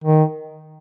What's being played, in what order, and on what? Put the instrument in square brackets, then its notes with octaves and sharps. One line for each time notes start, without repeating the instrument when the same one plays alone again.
[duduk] D#3